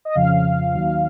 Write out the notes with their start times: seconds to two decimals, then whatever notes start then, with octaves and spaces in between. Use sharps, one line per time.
0.05 D#5
0.15 F2 C#3 F3 F5
0.74 D#2 D#3 F#3